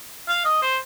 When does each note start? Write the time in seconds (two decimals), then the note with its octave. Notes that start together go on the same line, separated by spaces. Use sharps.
0.28 F5
0.45 D#5
0.62 C5